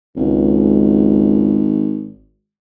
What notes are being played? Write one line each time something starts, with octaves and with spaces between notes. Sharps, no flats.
G#1 C#2